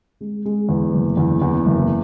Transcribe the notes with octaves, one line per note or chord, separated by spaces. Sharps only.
G#3
G#3
E2
F#1
E2
E2
F#1